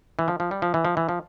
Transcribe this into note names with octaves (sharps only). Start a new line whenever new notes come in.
E3
F3
F3
G3
F3
E3
F3
E3
F3